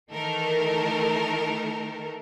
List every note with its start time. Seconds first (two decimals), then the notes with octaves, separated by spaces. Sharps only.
0.11 D#3 E3 A3 A4 A#4